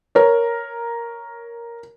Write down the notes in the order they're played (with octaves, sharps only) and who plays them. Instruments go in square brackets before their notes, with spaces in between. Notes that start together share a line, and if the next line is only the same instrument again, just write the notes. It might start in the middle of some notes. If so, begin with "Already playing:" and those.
[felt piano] A#4 C#5